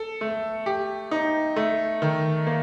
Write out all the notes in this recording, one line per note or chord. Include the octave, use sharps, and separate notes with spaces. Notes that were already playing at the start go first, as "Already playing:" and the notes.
Already playing: A4
A3
G4
D#4
A3
D#3
A#3